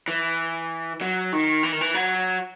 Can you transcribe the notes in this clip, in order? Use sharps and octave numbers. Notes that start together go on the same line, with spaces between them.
E3
F#3
D#3
E3
D#3
E3
F#3